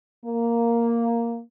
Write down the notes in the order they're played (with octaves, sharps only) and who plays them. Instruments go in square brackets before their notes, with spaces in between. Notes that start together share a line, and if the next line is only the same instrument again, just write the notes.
[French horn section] A#3